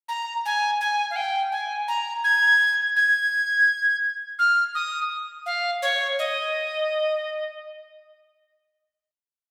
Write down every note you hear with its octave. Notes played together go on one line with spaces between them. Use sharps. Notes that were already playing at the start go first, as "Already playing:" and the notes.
A#5
G#5
G#5
F5
G5
G#5
A#5
G#6
G#6
F6
D#6
F5
C#5
D#5